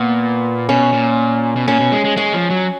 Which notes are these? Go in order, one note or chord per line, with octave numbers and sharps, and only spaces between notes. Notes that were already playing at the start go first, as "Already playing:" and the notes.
Already playing: A#2 B3
B2 C#4
A#2
B2
A#2 C#4
B2
G#3
G#3
G#3 C#4
F3
F#3